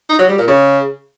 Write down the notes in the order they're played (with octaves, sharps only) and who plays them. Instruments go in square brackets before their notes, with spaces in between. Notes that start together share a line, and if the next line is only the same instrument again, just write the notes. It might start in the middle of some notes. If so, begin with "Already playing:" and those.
[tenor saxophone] D#4
F#3
G3
A#2
C#3